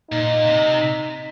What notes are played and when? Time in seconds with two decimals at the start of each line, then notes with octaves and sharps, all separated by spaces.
0.11 A#2 D#4
0.45 C3